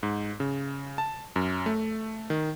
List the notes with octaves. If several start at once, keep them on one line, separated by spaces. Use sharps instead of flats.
G#2
C#3
A5
F#2
A3
D#3